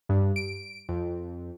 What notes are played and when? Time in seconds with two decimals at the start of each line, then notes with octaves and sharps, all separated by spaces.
0.09 G2
0.36 D7
0.89 F2